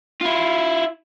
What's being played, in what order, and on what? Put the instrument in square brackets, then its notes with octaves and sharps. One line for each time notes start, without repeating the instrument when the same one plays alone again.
[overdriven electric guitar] E4 F4